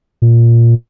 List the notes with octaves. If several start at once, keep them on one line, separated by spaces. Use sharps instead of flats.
A#2